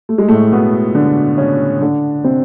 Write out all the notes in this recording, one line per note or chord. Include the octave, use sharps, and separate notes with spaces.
A3
G#3
A2 A3
B2 B3
D3 D4
C#3 C#4
D3 D4
C3 C4